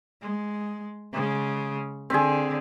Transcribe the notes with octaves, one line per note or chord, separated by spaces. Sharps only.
G#3
C#3 G#3
D3 C4 G#4